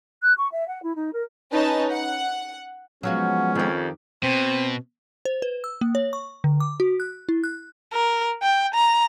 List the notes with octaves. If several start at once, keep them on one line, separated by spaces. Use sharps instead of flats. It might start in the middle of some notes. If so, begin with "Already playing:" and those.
F#6
C#6
E5
F#5
E4
D#4
A#4
C#4 D#4 B4 A5
F#5
F3 F#3 G#3 B3 C#4 F#4 F5
F2 D#3 G4
B2 C4
C5
B4
E6
A#3
C#5
C#6
D3
D6
F#4
F#6
E4
F#6
A#4
G5
A#5